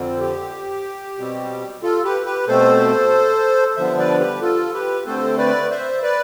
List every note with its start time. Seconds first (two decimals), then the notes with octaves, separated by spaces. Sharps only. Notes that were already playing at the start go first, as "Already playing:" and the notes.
Already playing: F2 D3 F3 C4
0.21 G4
1.18 B2 G3 C4
1.83 F4 A4
2.04 G4 B4
2.25 G4 B4
2.47 B2 A3 C4 A4 C5
3.77 G2 D3 F3 B3 D4 C5 E5
3.98 B4 D5
4.19 G4 B4
4.41 F4 A4
4.74 G4 B4
5.06 D3 A3 C4 A4 C5
5.38 B4 D5
5.70 C5 E5
6.03 B4 D5